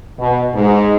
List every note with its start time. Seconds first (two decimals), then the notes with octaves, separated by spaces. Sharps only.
0.19 B2
0.53 G#2